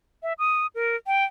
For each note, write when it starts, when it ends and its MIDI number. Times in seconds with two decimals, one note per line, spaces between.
0.23 0.33 76
0.39 0.67 87
0.75 0.96 70
1.07 1.24 79